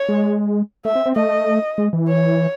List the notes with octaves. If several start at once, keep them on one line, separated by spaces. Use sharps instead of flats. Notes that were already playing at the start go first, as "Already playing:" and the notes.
Already playing: C#5
G#3
A3 E5
C4
C4
A3 D#5
G#3
E3
C#5